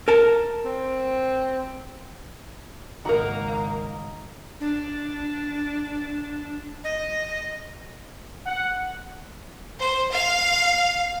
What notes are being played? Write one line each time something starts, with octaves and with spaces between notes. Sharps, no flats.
A#4 A5
C4
G#1 C#2 A#3 D#4 F#4 A#4 A#5
D4
D#5
F#5
C5
F5